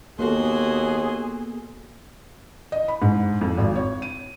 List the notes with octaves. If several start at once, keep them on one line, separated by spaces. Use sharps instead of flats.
D#2 A#3 B3 F#4 G#4 A4 C6
D#5
B5
G#2
F2
G#1
C#5
D#7